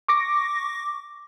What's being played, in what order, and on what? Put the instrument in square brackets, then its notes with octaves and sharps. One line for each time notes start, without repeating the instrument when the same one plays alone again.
[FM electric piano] C#6 D6 A#6